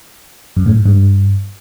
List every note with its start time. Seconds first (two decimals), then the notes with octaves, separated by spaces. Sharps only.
0.57 F#2
0.66 A2
0.76 G#2
0.86 G2